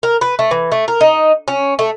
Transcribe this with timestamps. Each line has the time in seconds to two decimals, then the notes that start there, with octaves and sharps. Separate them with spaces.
0.03 A#4
0.21 B4
0.39 A3
0.51 E3
0.72 A3
0.88 A#4
1.01 D#4
1.48 C#4
1.79 A3